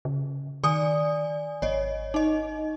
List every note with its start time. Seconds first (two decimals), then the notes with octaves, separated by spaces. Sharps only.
0.05 C#3
0.64 D#3 D5 G#5 D#6
1.62 G#1 C#5 D#5
2.14 D#4 D#5